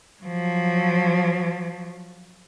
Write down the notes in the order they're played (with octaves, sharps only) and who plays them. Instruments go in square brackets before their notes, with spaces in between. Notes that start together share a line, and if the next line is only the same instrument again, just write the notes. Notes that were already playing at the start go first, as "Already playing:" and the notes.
[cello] F3 F#3